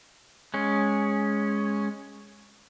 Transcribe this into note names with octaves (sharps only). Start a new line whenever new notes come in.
G#3 C#4